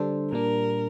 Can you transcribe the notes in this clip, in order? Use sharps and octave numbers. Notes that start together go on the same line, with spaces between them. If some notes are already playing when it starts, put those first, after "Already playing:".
Already playing: D3 G3 D4 A4 C5
A#2 G3 D4 A#4